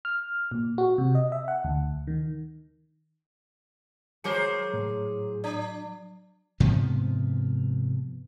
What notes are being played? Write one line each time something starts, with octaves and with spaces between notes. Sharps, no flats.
F6
A#2
F#4
C3
D#5
E5
F#5
D2
D#3
F#3 G#4 A#4 C5 C#5 D6 C#7
A2
D4 D5
G#2 C3 F3 B3